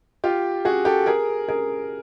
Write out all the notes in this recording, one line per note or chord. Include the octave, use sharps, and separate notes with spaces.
F4 G4
F#4 G#4
G4 A4
G#4 A#4
G#4 A#4